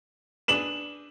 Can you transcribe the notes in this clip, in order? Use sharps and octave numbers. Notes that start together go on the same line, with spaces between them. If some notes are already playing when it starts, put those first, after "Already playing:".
D4 G#4 B4 E7 F#7